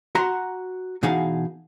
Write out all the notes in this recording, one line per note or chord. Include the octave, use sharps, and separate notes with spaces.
F#4 F#5 A#5 C6
B2 E3 D#4 G#4 F5 F#5